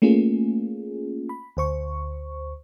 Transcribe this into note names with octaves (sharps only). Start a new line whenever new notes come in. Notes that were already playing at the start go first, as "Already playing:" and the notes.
A3 A#3 C#4 F4 G#4
B5
D2 C5 C#6